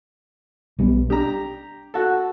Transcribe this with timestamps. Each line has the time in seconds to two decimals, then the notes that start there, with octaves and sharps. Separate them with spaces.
0.79 B1 G3 B3
1.10 D4 G4 A#5
1.94 F#4 A4